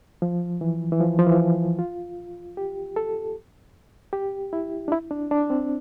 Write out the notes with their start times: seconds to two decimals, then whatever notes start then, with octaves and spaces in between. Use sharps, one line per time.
0.22 F3
0.61 E3
0.92 E3
1.01 F3
1.19 F3
1.27 E3
1.79 F4
2.57 G4
2.96 A4
4.13 G4
4.53 E4
4.88 D4
4.92 E4
5.11 D4
5.31 D4
5.50 C4